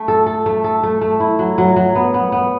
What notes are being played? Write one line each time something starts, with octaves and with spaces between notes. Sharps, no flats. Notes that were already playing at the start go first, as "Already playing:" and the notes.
Already playing: A3
A4
A4
A3
A4
A3
A3
E4
F#3
F#3
F#3
B3
B3
B3